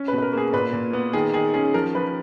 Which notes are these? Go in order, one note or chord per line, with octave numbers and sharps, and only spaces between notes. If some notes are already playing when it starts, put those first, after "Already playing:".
Already playing: C#4
B4
B2
B4
A#4
A#3 G#4
A#2 B4
A#2
B3
D#3 G#4
D#3 G#4
C#4 G#4
F3 A#4
F3 B4